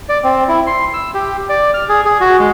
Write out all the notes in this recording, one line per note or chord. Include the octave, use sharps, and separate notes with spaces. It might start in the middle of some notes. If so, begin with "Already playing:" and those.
D5
C4
E4
C6
E6
G4
D5
F6
G#4
G#4
F#4
G#3